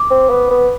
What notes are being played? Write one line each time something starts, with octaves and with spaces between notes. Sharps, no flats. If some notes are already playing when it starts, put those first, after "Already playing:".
Already playing: D6
C4
B3
B3